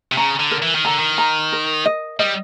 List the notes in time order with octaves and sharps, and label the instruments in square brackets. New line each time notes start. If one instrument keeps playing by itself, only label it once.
[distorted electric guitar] C3
[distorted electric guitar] C#3 [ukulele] A#5
[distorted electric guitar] D3
[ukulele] A#4
[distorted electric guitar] E3
D#3
[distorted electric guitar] D3 [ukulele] A#5
[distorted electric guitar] D#3
[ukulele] A#5
A#4
D#5
[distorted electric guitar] G3 [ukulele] D#5